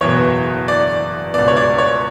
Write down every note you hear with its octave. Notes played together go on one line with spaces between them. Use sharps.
F#1 E2 B2 C#5
D5
C#2 B2 D5
C#5
D5
C#5